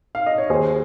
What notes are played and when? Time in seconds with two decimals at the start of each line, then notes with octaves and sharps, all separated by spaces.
0.15 F5
0.26 D#5
0.38 C#5
0.49 D#2 G#4 C5